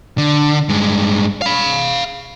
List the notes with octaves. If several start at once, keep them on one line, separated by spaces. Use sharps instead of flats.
D3
G2 G#3
F5 B5